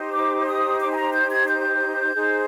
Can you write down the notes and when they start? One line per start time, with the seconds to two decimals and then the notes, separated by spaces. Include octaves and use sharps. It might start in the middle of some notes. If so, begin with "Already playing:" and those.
Already playing: D#4 G4 C5
0.13 D6
0.46 D#6
0.80 D6
0.91 G#5
0.97 A#5
1.13 G6
1.31 G#6
1.47 G6
2.14 D#4 G#4 C5